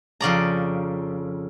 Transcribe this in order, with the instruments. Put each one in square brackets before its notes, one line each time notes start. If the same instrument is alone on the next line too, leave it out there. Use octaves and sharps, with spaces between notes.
[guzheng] F2 C#3 D5 A#5